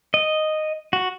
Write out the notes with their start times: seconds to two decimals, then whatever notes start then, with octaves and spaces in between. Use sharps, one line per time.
0.14 D#5
0.93 F#4